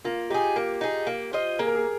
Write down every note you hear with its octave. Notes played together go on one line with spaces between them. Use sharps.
A#3 F4
D#4 G4 G#4
A#3
D#4 G#4
A#3
F4 C5 D#5
A#3 G#4
A#4
G#4